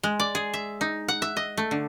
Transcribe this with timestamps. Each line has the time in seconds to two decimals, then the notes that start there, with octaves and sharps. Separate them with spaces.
0.03 G#3
0.20 D5
0.35 G#4
0.54 E5
0.81 D#4
1.08 F#5
1.22 E5
1.37 D#5
1.57 A3
1.71 D3